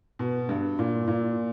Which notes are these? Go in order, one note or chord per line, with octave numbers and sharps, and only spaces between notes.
B2
G2
A#2
A#2